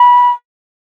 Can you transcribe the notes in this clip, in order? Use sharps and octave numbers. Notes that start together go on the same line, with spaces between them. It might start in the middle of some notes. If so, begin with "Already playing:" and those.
Already playing: B5